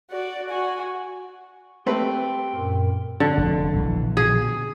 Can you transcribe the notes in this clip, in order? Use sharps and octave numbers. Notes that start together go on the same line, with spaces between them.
F#4 D5
F#4 G#5
A3 C4 G4 B4 G5 C6
F#2 A#2 A#4
D3
F1 F2
A#1 B2 E3
G#4